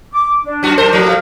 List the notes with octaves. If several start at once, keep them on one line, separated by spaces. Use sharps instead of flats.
D6
D4
F#2 F#4
F#2 A#4 C5
A2 F3 A3
F5